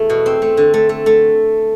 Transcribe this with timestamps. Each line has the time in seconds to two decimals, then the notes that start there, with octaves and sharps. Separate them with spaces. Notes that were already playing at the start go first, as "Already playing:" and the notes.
Already playing: E2 A3
0.10 B2
0.26 C4
0.42 A3
0.57 D3
0.74 A3
0.89 A3
1.06 A3